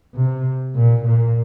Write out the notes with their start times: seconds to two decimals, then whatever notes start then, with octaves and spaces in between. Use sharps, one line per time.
0.15 C3
0.75 A#2
1.05 A#2